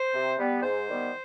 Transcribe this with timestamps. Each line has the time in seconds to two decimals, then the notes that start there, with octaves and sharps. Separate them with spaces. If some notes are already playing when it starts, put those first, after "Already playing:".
Already playing: C5
0.13 C3
0.38 G3 B3
0.62 G#2 C5
0.86 D#3 G3 B3